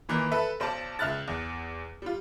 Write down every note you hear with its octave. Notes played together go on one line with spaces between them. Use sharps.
A#2 D#3 E3
A4 B4 E5
B1 C5 D5 F5 A5
C#2 E5 F6 F#6 A6
E2
G3 F4